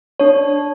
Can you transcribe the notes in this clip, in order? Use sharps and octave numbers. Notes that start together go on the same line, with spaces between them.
D4 C#5